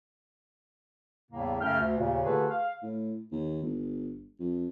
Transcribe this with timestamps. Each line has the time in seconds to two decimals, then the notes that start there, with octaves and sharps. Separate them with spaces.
1.31 E2 A2 C#3 G3 A#3
1.60 F#2 C#3 A3 G5 F6
1.79 D2
1.97 D#2 A#2 C#3
2.24 D3 A3 F4 G4 G#4 B4
2.50 F5
2.83 A2
3.32 D#2
3.63 G1
4.40 F2